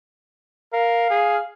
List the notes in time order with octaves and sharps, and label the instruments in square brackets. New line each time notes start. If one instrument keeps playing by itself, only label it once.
[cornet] A#4 [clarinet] F5
[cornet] G#4